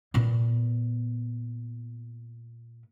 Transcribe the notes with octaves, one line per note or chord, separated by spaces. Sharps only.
A#2 B3